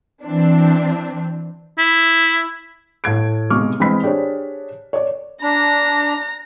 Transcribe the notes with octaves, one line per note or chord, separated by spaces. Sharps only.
E3 C4 D4
E4
A2 G#6 D7
B1 C3 G#3 C#6 D6 F6
E3 G#3 C4 D#5 B5 B6
D4 G4 G#4 C5 C#5
C#5 D5
D4 A#5